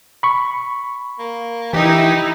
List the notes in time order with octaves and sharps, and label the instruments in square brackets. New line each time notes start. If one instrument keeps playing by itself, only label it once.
[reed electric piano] B5 C#6
[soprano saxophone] A#3
[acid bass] E3 [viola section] D#4 E4 [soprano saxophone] G4